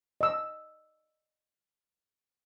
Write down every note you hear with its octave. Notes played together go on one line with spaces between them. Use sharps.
D#5 E6